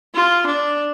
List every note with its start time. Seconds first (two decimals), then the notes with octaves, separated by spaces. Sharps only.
0.15 F4
0.46 D4